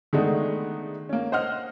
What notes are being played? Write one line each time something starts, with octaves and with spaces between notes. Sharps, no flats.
D#3 G#3 A3 B3 D4 D#4
A#3 C#4
C5 D#5 F#5 F6